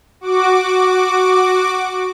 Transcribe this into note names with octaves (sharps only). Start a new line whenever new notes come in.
F#4 D6